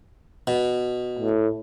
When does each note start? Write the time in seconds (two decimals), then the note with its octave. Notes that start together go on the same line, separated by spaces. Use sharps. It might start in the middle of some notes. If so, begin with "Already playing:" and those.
0.47 B2
1.19 A2